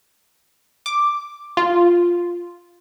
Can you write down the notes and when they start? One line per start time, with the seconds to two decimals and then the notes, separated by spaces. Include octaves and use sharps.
0.86 D6
1.57 F4